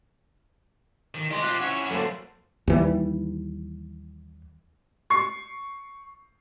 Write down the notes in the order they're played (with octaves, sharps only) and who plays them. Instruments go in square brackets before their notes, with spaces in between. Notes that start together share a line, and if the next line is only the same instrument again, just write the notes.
[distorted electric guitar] D#3
[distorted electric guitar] C4 G4 [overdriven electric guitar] D#5 C6
[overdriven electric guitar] F4 C5 [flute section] F#6
[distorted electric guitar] C#4 E4 [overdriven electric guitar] C#5 [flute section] F#5
[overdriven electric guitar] F#3 A#3 [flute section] A4 C5 F5
[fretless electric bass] D#2 E3 G3
[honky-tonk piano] C#6 C7